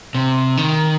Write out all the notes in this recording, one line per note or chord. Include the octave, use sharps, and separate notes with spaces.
C3
D#3